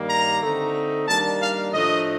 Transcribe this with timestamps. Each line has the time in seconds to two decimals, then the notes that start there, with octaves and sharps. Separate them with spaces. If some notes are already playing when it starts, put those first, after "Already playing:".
Already playing: G2 D#3 G3 A#3
0.10 A#5
0.41 D3 A3 C4 D#4
1.07 D#3 G3 A#3 D4 A5
1.40 F5
1.72 A2 F3 A3 D4 D#5